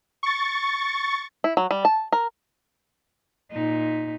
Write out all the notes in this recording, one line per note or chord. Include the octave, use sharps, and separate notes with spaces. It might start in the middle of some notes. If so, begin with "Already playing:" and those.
C#6 A6
E4
F#3
G3
A5
A#4
A#2 D#4